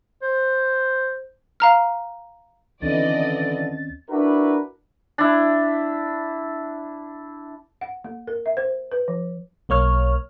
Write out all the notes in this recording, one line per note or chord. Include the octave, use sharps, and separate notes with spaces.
C5
F5 A#5 F6
D#2 D3 E3 C4 C#4 D5 D#5 A6
D4 E4 F#4 A#4 B4
D4 E4
F#5
A#3
A#4
E5
C5
B4
F3
B1 A#3 C#5 F6